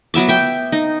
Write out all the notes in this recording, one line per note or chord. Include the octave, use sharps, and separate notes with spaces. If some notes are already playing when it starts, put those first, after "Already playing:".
F#3 B3 E5 D6
E5 G5
D#4